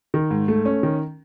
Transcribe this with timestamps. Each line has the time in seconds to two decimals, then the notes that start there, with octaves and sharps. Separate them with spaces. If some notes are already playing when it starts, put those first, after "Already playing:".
0.14 D#3
0.30 G#2
0.48 A3
0.65 C#4
0.83 D#3